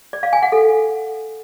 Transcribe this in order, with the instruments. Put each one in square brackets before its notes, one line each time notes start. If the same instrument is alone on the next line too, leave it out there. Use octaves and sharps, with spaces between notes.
[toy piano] D5
F5
G#5
F#5
A4